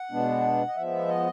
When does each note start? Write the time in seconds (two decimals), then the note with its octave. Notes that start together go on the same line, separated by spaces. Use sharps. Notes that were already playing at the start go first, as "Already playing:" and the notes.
Already playing: F#5
0.11 B2 G#3 B3 D4
0.67 D#5
0.76 F3 G#3 B3 E5
1.08 D#5